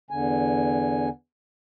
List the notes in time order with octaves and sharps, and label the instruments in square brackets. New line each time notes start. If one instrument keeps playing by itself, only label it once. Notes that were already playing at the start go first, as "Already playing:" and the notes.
[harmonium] E2 D3 G#5